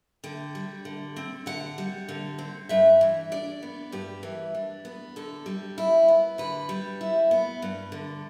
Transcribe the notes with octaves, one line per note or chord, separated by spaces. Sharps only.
D3 G5
G3
D3
C4
D3 F#5
G3
D3
C4
G2 E5
E3
D4 D5
B3
G2 G4
E3
D4
B3
D3 A4
G3
E4
B3
D3 B4
G3
E4
B3
G2
D3